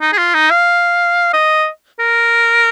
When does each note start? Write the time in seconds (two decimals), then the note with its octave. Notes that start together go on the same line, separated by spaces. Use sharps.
0.01 D#4
0.13 G#4
0.18 F4
0.34 D#4
0.51 F5
1.33 D#5
1.99 A#4